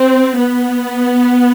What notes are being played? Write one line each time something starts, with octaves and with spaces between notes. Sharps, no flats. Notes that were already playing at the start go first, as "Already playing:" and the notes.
Already playing: C4
B3